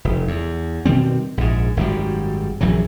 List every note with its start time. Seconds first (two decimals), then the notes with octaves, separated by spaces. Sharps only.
0.05 F1
0.28 E2
0.86 B2 D#3 G3 C4
1.37 A#1 G#2
1.77 G#1 F#2 B2 G3
2.61 A#1 F#2 E3 F#3